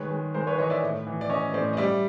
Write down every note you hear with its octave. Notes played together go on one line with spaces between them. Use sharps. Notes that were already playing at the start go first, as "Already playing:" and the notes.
Already playing: D#3 G#3 B4 C#5
G#3
G#3 A#4 C5
B4 C#5
E3 C#5 D#5
D5 E5
A2
E3
D5
C#4 C#5 D#5
A2 C5 D5
D#5
G3 D5 E5